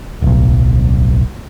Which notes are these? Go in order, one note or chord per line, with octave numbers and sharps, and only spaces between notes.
D1 B1